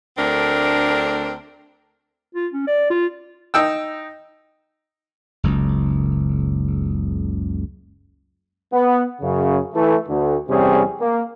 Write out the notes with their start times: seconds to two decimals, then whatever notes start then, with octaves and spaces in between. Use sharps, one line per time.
0.17 D2 A3 C4 D4 A#4
2.35 F4
2.53 C#4
2.67 D5
2.90 F4
3.54 D#4 G5 E6
5.43 F#1 C#2
8.73 B3
9.21 F#2 C#3
9.75 E3 A3
10.08 D2
10.49 E2 C3 G3 C4 C#4 G#4
11.01 A#3